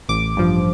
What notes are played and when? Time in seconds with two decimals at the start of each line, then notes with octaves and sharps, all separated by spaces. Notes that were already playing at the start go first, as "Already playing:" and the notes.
0.09 A1 D6
0.37 G2 F3